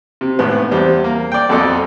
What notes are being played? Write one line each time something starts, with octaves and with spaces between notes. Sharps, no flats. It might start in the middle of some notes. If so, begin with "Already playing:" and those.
C3
G#1 A2 B3
E2 G3 C4
A#3
D5 G5
B1 F2 A4 D5 D#5